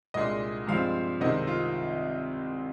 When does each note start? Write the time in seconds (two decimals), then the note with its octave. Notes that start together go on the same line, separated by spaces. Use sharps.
0.14 C2 A#2 G#3 D4 D#5
0.67 G2 F3 G#3 C4 F5
1.21 C2 C3 D#3 G#3 C4 D#5
1.47 F4